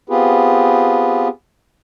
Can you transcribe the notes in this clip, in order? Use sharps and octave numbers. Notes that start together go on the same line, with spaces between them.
B3 C4 F4 G4 G#4 B4